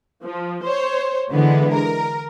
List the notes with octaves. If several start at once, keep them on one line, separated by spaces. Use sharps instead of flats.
F3
C5 C#5
D3 E3 G#3 B3
A#4